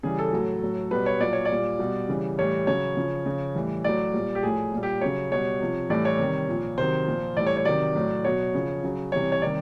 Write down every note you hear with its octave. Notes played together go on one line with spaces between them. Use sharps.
C#3 E3 G3 G#4
A4
A2 F#3
A2 F#3
B2 G3 B4
C#5
A#2 F#3 D5
C#5
D5
A#2 G3
B2 G3
C#3 E3 G3
A2 E3 G3 C#5
C#3 F#3 C#5
C#3 F3
C#3 F3
A2 E3 G3
A2 F#3 D5
A#2 G3
G4
A2 F3 G#4
A#2 G3
G4
C#3 F#3 C#5
B2 G3 C#5
C3 F3
A2 E3 G3 D5
C#5
C3 D#3 G3
A#2 F3
C3 D#3 F#3 C5
A#2 F3
A2 E3 G3 D5
C#5
C#5
C3 D#3 F#3 D5
A2 F#3
B2 F#3 C#5
C#3 F3
C#3 F#3
C3 E3 G3 C#5
C#5
C3 D#3 G3 D5